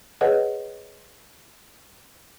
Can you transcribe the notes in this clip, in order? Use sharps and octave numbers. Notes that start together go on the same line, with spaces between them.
G#4 B4 C#5 D#5 F#5